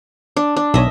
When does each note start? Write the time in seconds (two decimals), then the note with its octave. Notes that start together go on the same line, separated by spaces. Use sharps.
0.37 D4
0.57 D4
0.74 B1 C#5 D#5 E5